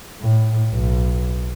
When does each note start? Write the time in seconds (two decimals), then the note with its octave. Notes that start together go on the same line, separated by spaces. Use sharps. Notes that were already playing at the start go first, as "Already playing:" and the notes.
0.21 A2
0.69 B1